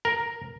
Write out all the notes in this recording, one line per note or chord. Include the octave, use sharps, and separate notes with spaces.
A#4